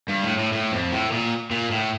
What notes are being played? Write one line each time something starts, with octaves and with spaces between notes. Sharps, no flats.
G2
A2
A2
A2
F2
A2
A#2
A#2
A2